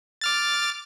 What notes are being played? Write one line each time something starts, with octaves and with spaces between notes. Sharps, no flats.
D6 F6 A6